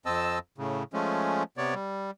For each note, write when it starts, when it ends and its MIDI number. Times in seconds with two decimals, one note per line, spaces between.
0.06 0.39 41
0.06 0.39 60
0.06 0.39 75
0.06 0.39 81
0.06 0.39 88
0.58 0.83 45
0.58 0.83 49
0.93 1.43 53
0.93 1.43 56
0.93 1.43 57
0.93 1.43 61
1.57 1.74 48
1.57 1.74 59
1.57 1.74 73
1.57 1.74 74
1.74 2.11 55